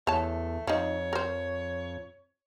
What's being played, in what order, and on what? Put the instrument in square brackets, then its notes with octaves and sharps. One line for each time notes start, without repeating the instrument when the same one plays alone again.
[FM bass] E2 [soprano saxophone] A3 [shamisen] C#5 A5
[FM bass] F2 [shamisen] F3 D#4 [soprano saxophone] C#5
[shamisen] A#4 C5